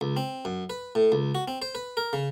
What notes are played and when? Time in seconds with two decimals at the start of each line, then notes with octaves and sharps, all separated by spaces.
0.01 C#2
0.17 C4
0.45 F#2
0.70 B4
0.95 A2
1.12 C#2
1.35 F#4
1.48 C4
1.62 C5
1.75 B4
1.97 A#4
2.13 C#3